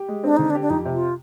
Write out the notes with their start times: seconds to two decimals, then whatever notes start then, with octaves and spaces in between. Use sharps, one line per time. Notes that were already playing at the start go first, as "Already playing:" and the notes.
Already playing: G4
0.08 G#3
0.24 C4 D4
0.37 D3 D#4
0.50 D4
0.55 G4
0.62 D4
0.70 F2 D#4
0.85 C3
0.93 F4